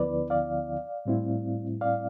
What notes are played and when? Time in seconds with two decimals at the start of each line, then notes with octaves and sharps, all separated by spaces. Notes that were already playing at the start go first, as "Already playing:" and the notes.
Already playing: D2 D3 F3 B3 E4 B4 D5
0.30 D5 F5
1.05 A2 G3 C4 E4
1.81 D5 F5